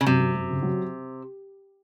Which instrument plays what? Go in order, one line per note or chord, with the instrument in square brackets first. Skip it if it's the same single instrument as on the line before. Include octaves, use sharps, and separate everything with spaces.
[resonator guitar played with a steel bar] C#3
[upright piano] F#2 [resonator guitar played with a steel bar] C3
[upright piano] F#2
F#2
C#3
F#3